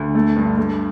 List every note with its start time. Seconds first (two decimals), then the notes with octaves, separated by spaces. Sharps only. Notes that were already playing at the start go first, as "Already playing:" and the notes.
Already playing: D2
0.15 A3
0.36 G2
0.58 A3